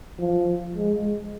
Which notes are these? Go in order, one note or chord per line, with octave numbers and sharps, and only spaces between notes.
F3
G#3